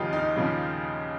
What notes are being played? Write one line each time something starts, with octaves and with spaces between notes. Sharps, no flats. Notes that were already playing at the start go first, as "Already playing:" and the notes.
Already playing: D#2 C#3 F3 D#4 F4 G4
D#4
D#2 C#3 F3